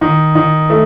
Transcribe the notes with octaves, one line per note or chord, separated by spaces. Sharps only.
D#3
D#3
A3